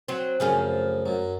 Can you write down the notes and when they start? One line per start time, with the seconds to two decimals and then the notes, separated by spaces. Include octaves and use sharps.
0.08 F#3 C4
0.40 F#2 C#3 F3 A3 C#4
1.06 F#2 F#3